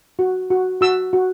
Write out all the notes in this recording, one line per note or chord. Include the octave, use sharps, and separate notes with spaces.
F#4
F#4
F#4 E6
F#4